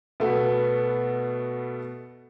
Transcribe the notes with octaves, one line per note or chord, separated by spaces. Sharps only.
B2 A3 B3